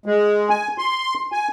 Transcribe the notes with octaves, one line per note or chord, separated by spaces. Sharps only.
G#3
G#5
C6
G#5